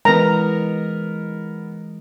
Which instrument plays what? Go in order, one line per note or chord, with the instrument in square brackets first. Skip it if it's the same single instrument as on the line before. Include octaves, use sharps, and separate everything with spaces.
[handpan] E3 G#3 [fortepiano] B3 A#4 [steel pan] A#5